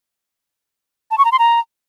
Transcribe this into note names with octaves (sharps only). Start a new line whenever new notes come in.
A5
C#6
A#5
C6
A#5